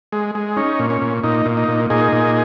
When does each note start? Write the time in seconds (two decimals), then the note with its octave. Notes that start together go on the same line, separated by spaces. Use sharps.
0.12 G#3
0.35 G#3
0.57 C#4 D#4
0.79 A#2
0.90 C#4
1.02 A#2
1.24 A#2 D#4
1.46 A#2
1.57 D#4
1.68 A#2
1.90 A#2 D#4 G#4
2.12 A#2